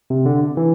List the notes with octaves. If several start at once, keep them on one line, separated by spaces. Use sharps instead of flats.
C3
D3
E3